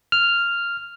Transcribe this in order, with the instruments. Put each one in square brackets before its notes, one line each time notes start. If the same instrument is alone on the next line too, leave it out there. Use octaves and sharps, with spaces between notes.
[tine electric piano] F6